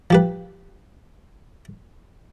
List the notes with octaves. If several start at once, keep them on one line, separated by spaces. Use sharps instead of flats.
F3 G4 B4